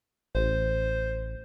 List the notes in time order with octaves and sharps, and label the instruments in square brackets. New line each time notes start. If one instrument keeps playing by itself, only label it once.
[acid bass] A1 [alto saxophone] C5